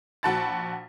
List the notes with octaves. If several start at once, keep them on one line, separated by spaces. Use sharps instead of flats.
A#1 F#4 F#5 A5 B5 A6